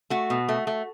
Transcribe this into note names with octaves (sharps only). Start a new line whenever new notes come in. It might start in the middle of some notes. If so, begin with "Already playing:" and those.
A3 F#4
B2
A3
A3